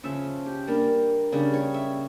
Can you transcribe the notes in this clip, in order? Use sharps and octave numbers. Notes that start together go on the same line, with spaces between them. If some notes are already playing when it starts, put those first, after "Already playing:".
C#3 F3 C#4 E5
G4
G3 A#3 D4 A#4
C#3 G3 D4
C#5
E5